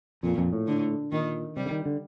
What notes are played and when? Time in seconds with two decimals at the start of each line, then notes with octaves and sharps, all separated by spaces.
0.23 F2 A#2
0.38 F2
0.53 A2
0.67 D3
1.12 A#2 D#3
1.56 C3 G3
1.65 D3
1.71 D#3
1.86 D3